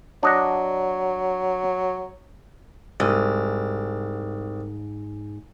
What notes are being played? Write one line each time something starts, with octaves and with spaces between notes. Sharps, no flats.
F#3 D4 D#5 F#5
C2 G#2